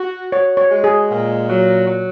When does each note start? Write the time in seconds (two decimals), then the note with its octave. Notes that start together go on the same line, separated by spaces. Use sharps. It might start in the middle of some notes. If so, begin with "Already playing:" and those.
Already playing: F#4
0.32 F#4 C#5
0.57 C#5
0.71 G#3
0.84 G#4
1.10 A#2
1.49 F#3
1.87 F#3